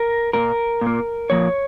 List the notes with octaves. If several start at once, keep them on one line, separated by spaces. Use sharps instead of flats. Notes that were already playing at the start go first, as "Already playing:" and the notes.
Already playing: A#4
A#2 A#3 A#4
A#2
A#3
A#2 F3 A#3 C#5